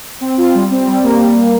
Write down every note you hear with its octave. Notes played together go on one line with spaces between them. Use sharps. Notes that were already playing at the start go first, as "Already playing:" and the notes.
C4
F4
G3
C4
G3
A#3
G3